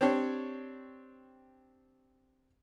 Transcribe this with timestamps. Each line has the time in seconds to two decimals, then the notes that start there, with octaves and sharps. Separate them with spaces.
0.01 C4 D4 G4 C#5